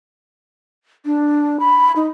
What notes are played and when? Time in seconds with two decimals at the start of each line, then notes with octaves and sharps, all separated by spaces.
1.05 D4
1.60 B5
1.96 D#4